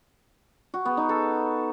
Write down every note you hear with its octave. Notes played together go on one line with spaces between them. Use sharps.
F#4
B3
D#4
A4